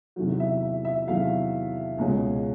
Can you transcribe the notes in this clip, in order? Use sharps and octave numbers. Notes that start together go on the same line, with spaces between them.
E2 C3 D#3 F#3
E5
E5
E5
E2 C3 D#3 F#3 F5
C#2 B2 G#3 C#4